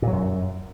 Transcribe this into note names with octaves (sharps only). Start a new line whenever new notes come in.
A#2
F#3
F#2